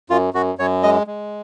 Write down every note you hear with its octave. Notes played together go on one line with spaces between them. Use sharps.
F#2 F4
F#2 F#4
F#2 C#5
G#3 D#5
G#3